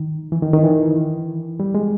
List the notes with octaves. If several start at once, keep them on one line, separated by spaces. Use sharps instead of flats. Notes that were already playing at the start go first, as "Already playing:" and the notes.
Already playing: D#3
E3
D#3
D#3
E3
G3
G#3